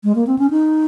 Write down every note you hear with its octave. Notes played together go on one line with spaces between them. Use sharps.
G#3
A#3
C4
C#4
D#4